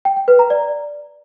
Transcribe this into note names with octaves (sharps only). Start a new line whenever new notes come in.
G5
G5
B4
A#5
D5